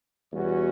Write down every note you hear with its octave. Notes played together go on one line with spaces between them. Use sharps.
E2 B2 G3 C#4 F#4